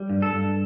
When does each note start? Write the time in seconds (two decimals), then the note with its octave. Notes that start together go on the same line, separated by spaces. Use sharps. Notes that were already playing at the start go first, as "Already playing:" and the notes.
Already playing: G3
0.10 G2
0.22 A4
0.34 G2